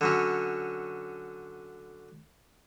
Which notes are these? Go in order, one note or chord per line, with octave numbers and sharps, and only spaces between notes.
D3 F#3 C#4